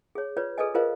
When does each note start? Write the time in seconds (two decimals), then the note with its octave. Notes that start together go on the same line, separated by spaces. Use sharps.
0.15 G#4 C#5
0.37 F4 B4 C#5 D5
0.58 G#4 A4 B4 D5 D#5 G#5
0.74 F4 G#4 A#4 C5 D#5 F5